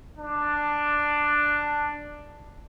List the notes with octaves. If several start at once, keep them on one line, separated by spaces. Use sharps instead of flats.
D4